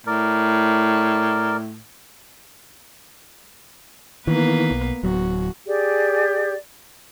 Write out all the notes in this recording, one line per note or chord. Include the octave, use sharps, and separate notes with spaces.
A2 A#4 D5
D#3 E3 A#3 B3 B4
B1
D1 F#3 F#4
G4 G#4 D5